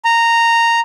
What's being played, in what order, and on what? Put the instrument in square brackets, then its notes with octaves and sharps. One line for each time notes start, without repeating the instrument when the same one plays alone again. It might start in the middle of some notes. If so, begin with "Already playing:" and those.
[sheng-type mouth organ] A#5